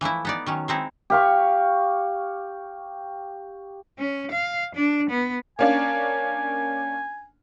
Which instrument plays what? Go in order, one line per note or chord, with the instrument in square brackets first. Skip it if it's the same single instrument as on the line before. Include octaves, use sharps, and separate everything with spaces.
[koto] E3 F3 A3 E4
B3 D#4 D5
D#3 F#3 C#4
G#3 C4 D#4 E4
[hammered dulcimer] G4 F5 C#6
[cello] C#4
F5
D4
B3
[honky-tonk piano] A#3 C#4 D4 [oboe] G#5